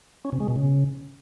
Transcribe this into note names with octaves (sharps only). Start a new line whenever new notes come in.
C#4
C3
G#3
B2
C#3